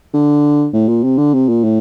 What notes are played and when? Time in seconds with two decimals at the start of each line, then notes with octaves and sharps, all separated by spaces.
0.14 D3
0.73 A2
0.88 A#2
1.03 C3
1.18 D3
1.34 C3
1.49 A#2
1.64 A2